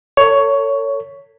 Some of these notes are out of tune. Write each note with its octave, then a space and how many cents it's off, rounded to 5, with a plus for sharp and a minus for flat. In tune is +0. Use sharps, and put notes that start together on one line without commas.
A4 +40 C#5 +15